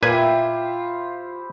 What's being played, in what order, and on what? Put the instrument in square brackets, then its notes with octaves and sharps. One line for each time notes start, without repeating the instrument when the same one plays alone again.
[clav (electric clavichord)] A#2 B4 G#5 [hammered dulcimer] E4 G4 C5 [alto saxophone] F4